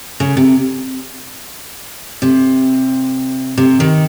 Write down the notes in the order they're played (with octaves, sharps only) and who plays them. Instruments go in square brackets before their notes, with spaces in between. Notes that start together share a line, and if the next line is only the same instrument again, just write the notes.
[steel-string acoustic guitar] C#3
C3
C3
C3
D#3